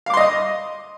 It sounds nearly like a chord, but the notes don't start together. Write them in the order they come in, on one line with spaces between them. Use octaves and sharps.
F5 D6 C6 D#5 D#6